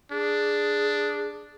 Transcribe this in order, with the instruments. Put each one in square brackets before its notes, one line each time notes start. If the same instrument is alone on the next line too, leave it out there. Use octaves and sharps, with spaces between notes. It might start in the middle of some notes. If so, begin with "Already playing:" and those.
[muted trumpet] D4 [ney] G#4